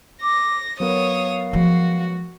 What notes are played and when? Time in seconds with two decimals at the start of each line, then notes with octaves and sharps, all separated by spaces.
0.22 D6 A#6
0.80 F#3 B3 A#4 C#5 F5 D#6
1.53 F3 G#3 F#4